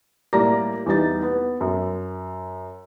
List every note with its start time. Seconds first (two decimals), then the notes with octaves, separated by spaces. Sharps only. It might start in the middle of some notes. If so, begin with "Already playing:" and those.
0.33 A2 G3 A#3 D5 A#5 A#6
0.86 E2 G3 D#4 A6
1.22 B3
1.61 F#2